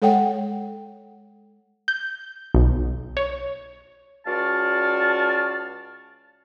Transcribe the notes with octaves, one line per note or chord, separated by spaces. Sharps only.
G#3 A4 C#5 F#5 G5
G6
B1
C#5
C#2 F#4 D5 F5 A5